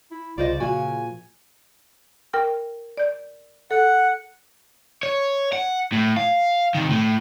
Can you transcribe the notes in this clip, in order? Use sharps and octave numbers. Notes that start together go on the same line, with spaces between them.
E4
C2 C#3 F4 C5 D5 D#5
A#2 F3 F#4 F5 G#5
A#4 G5 F6
D5 G6
A4 F#5
C#5
F#5
A2
F5
C3 D#3
A2